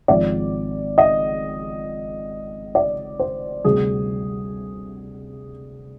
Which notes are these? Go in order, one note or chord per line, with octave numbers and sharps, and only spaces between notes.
G#1 G#2 F3 D5
D#5
D5
C5
D2 C3 G3 G#4